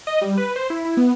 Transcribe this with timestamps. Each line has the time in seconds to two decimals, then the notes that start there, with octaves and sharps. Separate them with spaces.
0.07 D#5
0.22 G3
0.37 B4
0.56 C5
0.70 E4
0.85 E4
0.97 B3